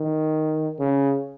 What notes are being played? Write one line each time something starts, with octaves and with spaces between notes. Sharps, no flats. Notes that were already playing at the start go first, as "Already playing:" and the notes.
Already playing: D#3
C#3